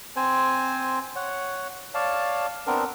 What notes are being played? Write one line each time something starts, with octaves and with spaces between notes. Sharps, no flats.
C4 C5 G#5
C#5 F#5
C#5 D5 F5 A5
B3 C4 D4 A#4